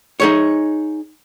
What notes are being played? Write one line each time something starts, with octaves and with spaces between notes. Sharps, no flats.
D#4 G#4 C#5